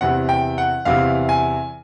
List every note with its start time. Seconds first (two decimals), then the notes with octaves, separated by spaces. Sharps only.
0.01 E2 C3 E3 F#5
0.29 G5
0.58 F#5
0.85 E2 C3 E3 F5
1.29 G#5